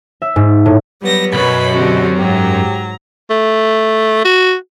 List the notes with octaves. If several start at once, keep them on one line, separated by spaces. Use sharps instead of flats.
E5
G#2
A2
F#3 G3 B3 A#6
C2 F#2 B2 B4 C#5 B5
D3 C4 F#4 G4
G#2 F#3 G4 A#5
A3
F#4